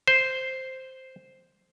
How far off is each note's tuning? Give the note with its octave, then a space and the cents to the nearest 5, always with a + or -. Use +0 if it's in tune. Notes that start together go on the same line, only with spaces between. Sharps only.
C5 +0